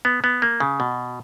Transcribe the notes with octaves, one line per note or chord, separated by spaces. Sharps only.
B3
B3
A#3
C#3
B2